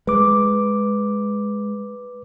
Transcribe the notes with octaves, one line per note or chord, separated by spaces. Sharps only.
G#3 B4 D6